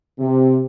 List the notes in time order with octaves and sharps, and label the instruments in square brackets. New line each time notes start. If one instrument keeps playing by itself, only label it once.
[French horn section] C3